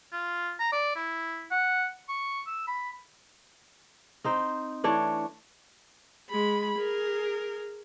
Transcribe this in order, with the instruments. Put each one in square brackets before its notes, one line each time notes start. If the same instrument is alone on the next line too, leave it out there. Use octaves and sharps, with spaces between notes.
[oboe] F4
A#5
D5
E4
F#5
C#6
E6
B5
[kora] C4 D#4 C5
E3 A3 D4 C#5
[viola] G#3 B5
G#4 A#4